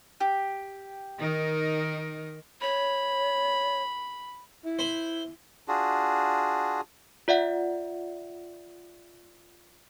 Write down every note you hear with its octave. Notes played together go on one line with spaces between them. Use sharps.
G4
D#3 D#4 A#4
C#5 B5
E4
C5 B5 C6
D4 F4 F#4 G#4
F4 D5 E5 F#5